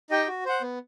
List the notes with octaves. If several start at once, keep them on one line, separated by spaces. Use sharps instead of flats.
D#4 G4 D#5 G5
F#4
C5 F#5
B3